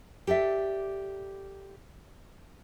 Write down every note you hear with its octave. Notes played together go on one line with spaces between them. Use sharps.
G4 A4 D5 E5